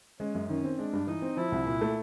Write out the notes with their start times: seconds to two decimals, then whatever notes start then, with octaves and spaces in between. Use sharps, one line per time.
0.19 G#3 C#4
0.35 F#2
0.49 D#3 C#4
0.64 C4
0.79 G#3 D4
0.93 G2
1.07 E3 D#4
1.22 C4
1.37 F3 E4
1.52 C2
1.66 A#2
1.81 A3